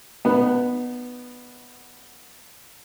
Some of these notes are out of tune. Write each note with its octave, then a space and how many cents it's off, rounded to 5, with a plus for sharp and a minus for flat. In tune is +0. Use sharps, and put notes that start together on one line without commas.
B3 +0 D#4 -40